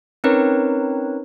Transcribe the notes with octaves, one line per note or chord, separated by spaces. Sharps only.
C4 C#4 D#4 A#4 B4 C#5